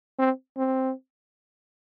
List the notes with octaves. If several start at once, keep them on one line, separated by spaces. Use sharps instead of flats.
C4
C4